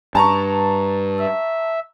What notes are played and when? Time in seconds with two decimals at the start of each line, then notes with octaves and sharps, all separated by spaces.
0.15 G2 A5 A#5 C#6
1.19 E5